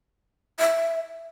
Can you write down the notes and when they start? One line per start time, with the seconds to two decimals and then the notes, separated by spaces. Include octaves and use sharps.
0.59 E5